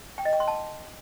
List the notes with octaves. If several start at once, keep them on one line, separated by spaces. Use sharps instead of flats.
G5
D#5
G5
C6
A5